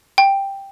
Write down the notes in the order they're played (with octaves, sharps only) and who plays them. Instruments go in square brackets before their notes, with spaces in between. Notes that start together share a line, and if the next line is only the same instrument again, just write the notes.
[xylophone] G5